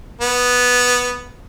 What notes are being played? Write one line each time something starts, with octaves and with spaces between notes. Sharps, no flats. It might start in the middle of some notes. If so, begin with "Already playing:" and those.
B3